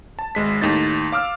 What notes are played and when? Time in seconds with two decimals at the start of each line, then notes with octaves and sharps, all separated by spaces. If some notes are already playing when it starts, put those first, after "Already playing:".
0.19 A5
0.35 G#1 G#3 B6
0.62 D#2 A2 D#4 A6
1.12 F5 D6 E6 F6